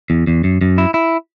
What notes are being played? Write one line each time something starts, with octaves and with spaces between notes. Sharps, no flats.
E2
E2
F#2
F#2
E4
E4